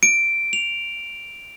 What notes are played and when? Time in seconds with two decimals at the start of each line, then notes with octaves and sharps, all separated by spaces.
0.03 D7
0.53 F7